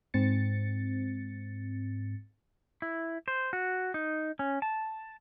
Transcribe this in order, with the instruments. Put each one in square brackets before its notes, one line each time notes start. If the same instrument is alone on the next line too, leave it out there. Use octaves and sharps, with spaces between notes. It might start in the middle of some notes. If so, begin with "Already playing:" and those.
[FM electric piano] G#2 C4 A6 C#7
[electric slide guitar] E4
C5
F#4
D#4
C#4
A5